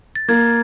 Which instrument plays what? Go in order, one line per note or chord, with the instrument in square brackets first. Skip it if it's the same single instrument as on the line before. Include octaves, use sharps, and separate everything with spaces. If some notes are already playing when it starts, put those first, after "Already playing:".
[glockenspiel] A6
[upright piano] A#3 [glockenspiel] G#6